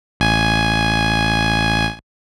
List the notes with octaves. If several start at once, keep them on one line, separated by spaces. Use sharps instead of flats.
A1 G#5